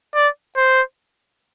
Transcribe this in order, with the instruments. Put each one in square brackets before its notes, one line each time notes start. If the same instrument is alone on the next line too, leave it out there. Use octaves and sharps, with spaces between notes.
[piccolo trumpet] D5
C5